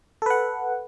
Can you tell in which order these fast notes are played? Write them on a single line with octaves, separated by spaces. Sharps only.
A4 B4 F#5